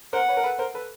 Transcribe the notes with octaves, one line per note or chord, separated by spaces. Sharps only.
A#4 C5 F#5
B4 C#5
A#4
A4 B4
A#4 C5
A4 B4